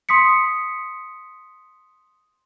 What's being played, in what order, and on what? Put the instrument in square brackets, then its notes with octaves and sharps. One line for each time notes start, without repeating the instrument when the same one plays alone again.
[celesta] C6 D#6 B6 C#7